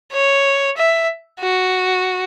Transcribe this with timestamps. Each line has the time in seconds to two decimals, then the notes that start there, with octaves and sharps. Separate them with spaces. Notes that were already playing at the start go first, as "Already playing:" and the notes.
0.13 C#5
0.77 E5
1.40 F#4